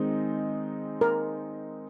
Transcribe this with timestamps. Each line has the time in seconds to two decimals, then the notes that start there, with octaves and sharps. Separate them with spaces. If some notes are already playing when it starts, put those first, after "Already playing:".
Already playing: D#3 G#3 C4 D#4
1.01 A#4